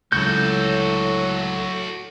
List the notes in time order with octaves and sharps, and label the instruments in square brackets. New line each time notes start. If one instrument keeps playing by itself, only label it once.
[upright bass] C#2 D3 [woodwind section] A2 F#3 [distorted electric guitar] F#4 A4 [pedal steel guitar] G6